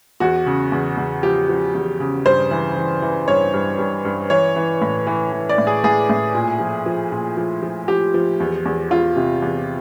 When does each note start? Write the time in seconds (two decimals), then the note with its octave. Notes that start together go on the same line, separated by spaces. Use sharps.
0.20 E2 F#4
0.46 C#3
0.72 E2
0.97 E2
1.23 F3 G4
1.49 F3
1.75 E2
2.00 C#3
2.25 G2 C5
2.51 E3
2.76 E3
3.02 E3
3.28 G2 C#5
3.53 G2
3.79 G2
4.05 G2
4.30 E3 C#5
4.56 E3
4.82 A2
5.07 E3
5.32 E3
5.49 D5
5.58 A2
5.67 G#4
5.84 A2 G#4
6.10 A2
6.35 A#2
6.60 F3
6.86 F3
7.12 A#2
7.37 F3
7.63 F3
7.88 F3 G4
8.14 F3
8.40 E2
8.66 E2
8.90 E2 F4
9.17 C3
9.42 E2